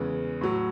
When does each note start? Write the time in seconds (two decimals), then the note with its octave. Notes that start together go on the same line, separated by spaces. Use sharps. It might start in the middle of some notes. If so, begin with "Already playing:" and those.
Already playing: E2 C#3 E3 G#3
0.41 A2 F#3